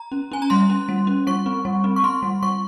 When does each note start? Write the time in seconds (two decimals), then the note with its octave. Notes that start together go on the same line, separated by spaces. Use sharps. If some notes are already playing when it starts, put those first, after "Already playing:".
Already playing: A#5
0.12 C#4
0.31 C#4 G#5
0.42 A#5
0.50 G3 C6
0.70 C#4
0.89 G3
1.07 C#4
1.27 G3 C#6
1.46 C4
1.65 G3
1.84 C4
1.96 C#6
2.04 C4 C6
2.23 G3
2.42 G3 C#6